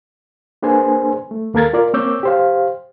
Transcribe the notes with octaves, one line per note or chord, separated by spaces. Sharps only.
A#3 D4 G#4 B4 C5 G#5
A3
D#2 A#3 A4 A#4 G#6 A6
F4 A#4 D5
A#3 C4 C#5 D6 E6 G6
G4 C5 F5